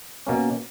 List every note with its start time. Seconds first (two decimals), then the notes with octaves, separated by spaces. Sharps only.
0.27 B2 A#3 C#4